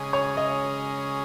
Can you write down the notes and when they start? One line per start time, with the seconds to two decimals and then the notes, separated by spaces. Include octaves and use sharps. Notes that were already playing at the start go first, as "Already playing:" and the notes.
Already playing: C#3 G#3 C#4 G#4
0.13 C#5
0.37 D#5